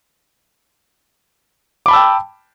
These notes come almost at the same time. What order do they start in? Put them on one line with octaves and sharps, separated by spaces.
D6 B5 A5 E6 G5